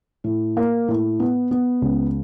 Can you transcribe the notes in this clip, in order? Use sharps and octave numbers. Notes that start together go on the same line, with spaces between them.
A2
A#3
A2
B3
B3
C#2